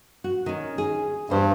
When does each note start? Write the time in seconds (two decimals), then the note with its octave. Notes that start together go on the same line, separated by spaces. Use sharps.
0.24 F#4
0.46 D#3 C#4
0.78 G#4
1.30 E2 G2 C5